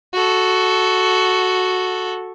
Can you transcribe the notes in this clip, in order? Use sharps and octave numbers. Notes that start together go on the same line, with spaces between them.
F#4 A4